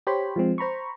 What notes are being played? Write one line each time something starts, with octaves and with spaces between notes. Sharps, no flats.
G4 C5 C#5 G5 B5
F3 G#3 C4
C5 A#5 B5 C#6